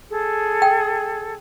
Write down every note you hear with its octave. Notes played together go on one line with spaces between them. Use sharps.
G#4 A4
G5